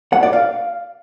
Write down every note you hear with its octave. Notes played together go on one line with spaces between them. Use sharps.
F#5
D5
F5